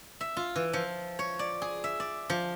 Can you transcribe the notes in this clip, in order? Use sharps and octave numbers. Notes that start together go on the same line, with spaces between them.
E5
F4
E3
F3
C#5
D5
G#4
E5
D5
F3